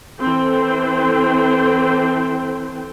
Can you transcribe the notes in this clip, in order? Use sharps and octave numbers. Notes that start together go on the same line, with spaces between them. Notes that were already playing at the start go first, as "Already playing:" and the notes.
E3 C4 A4 C5 G5